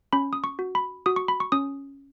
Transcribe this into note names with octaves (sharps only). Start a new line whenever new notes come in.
C#4 B5
D#6
C#6
F#4
B5
F#4 D#6
C#6
B5
C#6
C#4 D#6